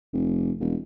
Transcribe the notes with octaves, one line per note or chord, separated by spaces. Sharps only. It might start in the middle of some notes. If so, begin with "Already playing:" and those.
F1
E1